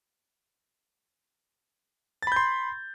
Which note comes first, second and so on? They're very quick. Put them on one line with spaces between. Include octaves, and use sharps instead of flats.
A6 B5 G6 C6